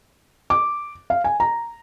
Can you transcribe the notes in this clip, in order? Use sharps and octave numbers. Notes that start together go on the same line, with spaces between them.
D6
F5
G#5
A#5